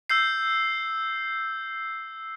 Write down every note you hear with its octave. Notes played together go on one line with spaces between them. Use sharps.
E6 G6 C7